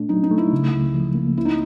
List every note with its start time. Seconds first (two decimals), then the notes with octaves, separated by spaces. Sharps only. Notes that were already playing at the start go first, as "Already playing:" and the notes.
Already playing: A#2 A3 D4
0.09 F#3 D#4
0.23 D#4
0.31 A3
0.38 E4
0.53 C#3
0.73 C#2
0.95 F3
1.15 A#3
1.37 C#2 E4
1.45 D#4